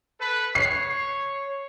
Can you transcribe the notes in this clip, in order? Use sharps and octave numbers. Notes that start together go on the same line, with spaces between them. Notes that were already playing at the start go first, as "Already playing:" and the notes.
A4 B4
C#5 C7